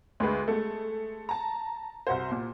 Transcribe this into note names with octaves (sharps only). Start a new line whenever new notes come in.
D2 G#3 B4
G#3 A3
A5 A#5
C2 F#4 C5
A#2